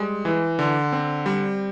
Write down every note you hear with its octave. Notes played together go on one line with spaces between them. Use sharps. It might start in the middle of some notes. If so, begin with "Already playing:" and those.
Already playing: G3 G#3
E3
D3
C4
G3